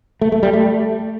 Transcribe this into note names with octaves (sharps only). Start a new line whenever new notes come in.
A3
A3
G3
A3